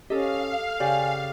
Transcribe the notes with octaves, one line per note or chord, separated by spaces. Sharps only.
C#4 G4 A4 D#5 F5
C#3 G4 D5 G#5